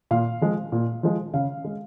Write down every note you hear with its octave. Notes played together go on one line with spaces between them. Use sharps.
A#2 F5
F3 G#3
A#2
F3 G#3
C#3 F5
G#3